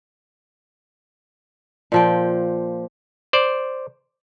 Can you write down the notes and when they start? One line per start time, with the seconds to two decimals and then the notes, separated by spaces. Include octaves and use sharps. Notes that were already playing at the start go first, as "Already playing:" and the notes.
1.92 A#2 F3 G5
3.33 C5 D5